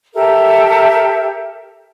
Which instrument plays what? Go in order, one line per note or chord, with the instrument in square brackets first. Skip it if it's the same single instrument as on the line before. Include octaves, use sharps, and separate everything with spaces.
[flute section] G4 A4 A#4 E5